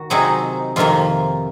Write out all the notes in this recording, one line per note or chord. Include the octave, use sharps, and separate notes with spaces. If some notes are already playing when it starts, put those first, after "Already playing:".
Already playing: D#3 F#4
C3 F#3 C4 D#4 G#4
F2 C3 D#3 A#3 F4